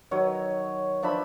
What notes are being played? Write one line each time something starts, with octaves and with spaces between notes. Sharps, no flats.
D#3 F#3 C#5
F3 D4 E5 B5